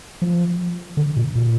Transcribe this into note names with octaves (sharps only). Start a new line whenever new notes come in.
F3
D3
A#2
A#2